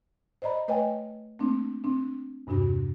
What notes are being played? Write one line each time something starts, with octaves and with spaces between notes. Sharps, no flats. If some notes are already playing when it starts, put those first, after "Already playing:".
C5 D5 D#5 A#5 B5
A3 B4 C#5 D#5 G5 G#5
A3 A#3 C4 D4
C4 D4
E2 G2 C3 D4 F#4